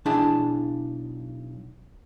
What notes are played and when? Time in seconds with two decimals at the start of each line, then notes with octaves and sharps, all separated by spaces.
0.06 B1 D4 E4 G#4 A5